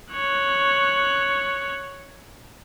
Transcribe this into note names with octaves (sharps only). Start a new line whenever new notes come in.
C#5 F#6